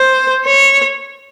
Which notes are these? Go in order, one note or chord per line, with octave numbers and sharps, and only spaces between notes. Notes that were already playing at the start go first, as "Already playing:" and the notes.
Already playing: C5
C#5